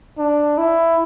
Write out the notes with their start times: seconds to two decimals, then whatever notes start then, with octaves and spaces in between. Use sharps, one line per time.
0.18 D4
0.58 E4